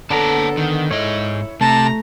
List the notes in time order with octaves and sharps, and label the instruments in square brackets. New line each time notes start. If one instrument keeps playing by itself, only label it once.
[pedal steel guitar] D3 B3 A#5 [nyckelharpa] A4 [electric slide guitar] C#5 D5 A5
[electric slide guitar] D#3
[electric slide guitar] G#2 D#5 [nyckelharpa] E4 [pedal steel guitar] C#5
[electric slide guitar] C3 [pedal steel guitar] A3 [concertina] A5 [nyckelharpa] A#5